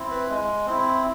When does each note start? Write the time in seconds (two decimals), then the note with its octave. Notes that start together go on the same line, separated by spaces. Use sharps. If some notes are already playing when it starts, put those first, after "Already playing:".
Already playing: C4 E4
0.11 B4
0.30 G#3
0.66 C4 E4